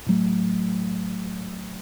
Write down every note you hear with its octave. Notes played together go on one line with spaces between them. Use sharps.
A2 F#3 A3